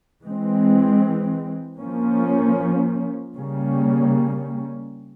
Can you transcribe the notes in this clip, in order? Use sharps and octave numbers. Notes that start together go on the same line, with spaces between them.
E3 G#3 C4
F3 A#3 C#4
C#3 G3 A#3 C#4